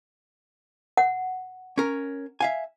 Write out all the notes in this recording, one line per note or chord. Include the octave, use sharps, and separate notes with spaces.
F#5
C#4 A#4
E5 F5 G#5